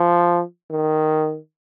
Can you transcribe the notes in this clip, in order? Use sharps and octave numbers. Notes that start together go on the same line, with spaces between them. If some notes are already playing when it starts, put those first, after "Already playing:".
Already playing: F3
D#3